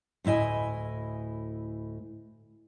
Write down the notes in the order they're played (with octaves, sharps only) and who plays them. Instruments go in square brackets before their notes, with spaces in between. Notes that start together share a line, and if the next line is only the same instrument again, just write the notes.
[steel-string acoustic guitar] D2 A2 E4 D#5 G#5